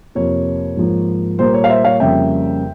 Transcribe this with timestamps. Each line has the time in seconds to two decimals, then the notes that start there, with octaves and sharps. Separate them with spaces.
0.15 F2 C3 F3 A#3 C#5
0.77 G#2 F3 A#3
1.39 A#2 G3 A#3 C5
1.54 C#5
1.64 F5
1.69 C5 E5
1.85 C#5 F5
2.00 F2 C#3 G3 A#3 E5 G5